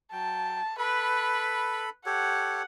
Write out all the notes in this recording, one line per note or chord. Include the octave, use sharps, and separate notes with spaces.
F#3 G5 A5
A4 B4 B5
G4 A4 C#5 F#5